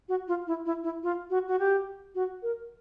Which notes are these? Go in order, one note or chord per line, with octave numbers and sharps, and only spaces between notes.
F#4
F4
E4
E4
E4
F4
F#4
F#4
G4
F#4
A#4